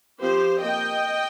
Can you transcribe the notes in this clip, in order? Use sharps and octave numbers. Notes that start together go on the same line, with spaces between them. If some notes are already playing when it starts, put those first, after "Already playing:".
F3 C4 G4 C5
A#3 D#5 G5